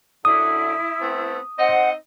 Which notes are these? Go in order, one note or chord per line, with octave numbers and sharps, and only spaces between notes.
F#2 D3 E4 D#6 E6
A3 B3 C4
C4 D#4 C5 D#5 F#5